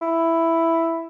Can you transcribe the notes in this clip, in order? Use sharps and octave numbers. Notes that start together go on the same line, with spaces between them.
E4